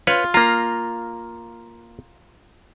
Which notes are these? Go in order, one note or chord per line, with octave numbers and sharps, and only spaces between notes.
F4 B4 C#5
A#3 F4 A#5